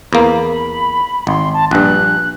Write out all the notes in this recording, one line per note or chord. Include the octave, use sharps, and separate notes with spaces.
E2 A#3 B5
G#1 C6
A5
A#1 G2 F#6